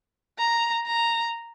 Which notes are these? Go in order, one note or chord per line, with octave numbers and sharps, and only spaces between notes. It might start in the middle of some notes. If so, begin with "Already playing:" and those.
A#5
A#5